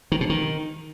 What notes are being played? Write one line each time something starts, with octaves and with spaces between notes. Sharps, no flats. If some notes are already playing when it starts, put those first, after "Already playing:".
D#3
B2
D#3